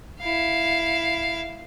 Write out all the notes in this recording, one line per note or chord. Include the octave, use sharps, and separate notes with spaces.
E4 F5